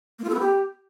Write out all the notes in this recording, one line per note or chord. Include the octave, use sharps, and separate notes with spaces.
A#3
F4
A4
B3
G4